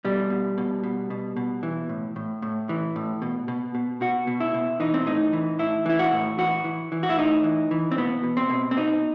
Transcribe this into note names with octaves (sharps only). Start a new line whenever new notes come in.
B2 G3
B2
B2
B2
B2
B2
E3
A2
A2
A2
E3
A2
B2
B2
B2
B2 F#4
B2
E4
B2
E3 D#4
C4
A2 D#4
E3
A2 E4
E3 E4
F#4
A2
E3 F#4
E3
E3
F#4
E4
A2 D#4
E3
E3
C4
B2 B3
B2
C4
B2
C4
B2 D#4